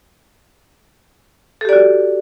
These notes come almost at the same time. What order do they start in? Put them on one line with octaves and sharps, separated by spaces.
A4 G4 D5 F#4